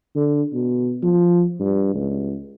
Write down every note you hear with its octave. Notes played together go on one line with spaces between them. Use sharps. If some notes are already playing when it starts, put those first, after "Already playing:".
D3
B2
F3
G2
C#2